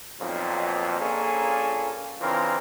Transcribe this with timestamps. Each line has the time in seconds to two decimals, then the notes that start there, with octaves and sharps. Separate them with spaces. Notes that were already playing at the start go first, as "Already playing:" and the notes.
0.21 B1 F2 A#2
1.00 A#1 A#2 A#3 C#4 G#4 A4
2.21 C#3 E3 C4 D4 F4 A#4